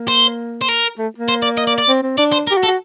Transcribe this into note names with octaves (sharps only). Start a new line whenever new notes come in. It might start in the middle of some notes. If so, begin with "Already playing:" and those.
Already playing: A#3
C5
C5
A#4
A3
A#3
C5
D5
D#5
D5
D5
C4
C4
D4 D5
C5
A#4
G4
F#4
A4
F#4